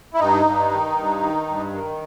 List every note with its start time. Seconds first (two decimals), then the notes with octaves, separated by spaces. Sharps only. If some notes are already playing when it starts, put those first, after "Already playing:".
0.14 E4
0.19 G2 D#4
0.46 G2
0.72 D#3
0.97 G2
1.23 D#3
1.48 G2
1.73 D#3